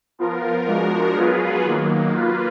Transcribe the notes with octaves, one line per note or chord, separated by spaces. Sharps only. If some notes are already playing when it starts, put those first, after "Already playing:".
F3 B3 F4 A#4
F3 G#3 D4 F#4 A#4
F#3 B3 F4 G#4 B4
D#3 F#3 A#3
A#3 F4 B4